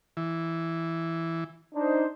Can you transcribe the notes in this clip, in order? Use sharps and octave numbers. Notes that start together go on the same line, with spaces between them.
E3
D4 D#4 C5